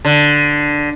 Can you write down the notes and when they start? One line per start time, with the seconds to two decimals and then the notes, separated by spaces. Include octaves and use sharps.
0.05 D3